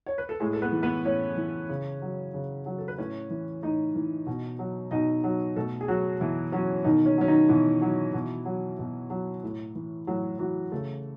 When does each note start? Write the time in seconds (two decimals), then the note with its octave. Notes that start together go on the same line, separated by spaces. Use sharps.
0.06 C#5
0.18 B4
0.29 A4
0.40 A2 G#3 G#4
0.53 A4
0.62 B3 B4
0.72 E3
0.83 B3 B4
1.05 A2 C#4 C#5
1.37 E3
1.69 C#3
2.02 F#3
2.34 C#3
2.66 F#3
2.78 A4
2.88 B4
2.98 A2 C#4 C#5
3.30 E3
3.62 A2 D#4 D#5
3.95 E3
4.26 B2
4.59 F#3
4.91 B2 D#4 D#5
5.24 F#3
5.56 B2 A3 A4
5.81 G#4
5.88 F#3 F#4
6.20 B2 E3 E4
6.52 F#3 C#4
6.84 B2 D#3 D#4
7.06 C#4
7.18 F#3 C#4
7.28 D#3 D#4
7.49 B2 E3 E4
7.82 F#3
8.13 B2
8.45 F#3
8.79 B2
9.10 F#3
9.43 A2
9.75 E3
10.07 A2 F#3 F#4
10.39 E3 F#3 F#4
10.72 C#3 A3 A4